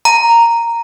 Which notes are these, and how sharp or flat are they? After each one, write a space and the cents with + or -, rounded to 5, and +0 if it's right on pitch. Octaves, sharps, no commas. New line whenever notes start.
A#5 -5